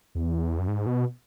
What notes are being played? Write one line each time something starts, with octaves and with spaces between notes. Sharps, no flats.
E2
F#2
G#2
B2